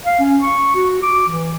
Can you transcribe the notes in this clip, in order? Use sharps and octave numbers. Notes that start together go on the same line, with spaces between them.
F5
C#4
C#6
F#4
D6
E3